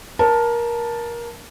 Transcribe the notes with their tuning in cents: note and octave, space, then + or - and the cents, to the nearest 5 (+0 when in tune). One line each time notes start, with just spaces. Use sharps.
A#4 +20 A5 +0